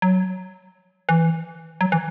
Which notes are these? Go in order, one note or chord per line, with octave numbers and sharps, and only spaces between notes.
F#3
E3
F#3
E3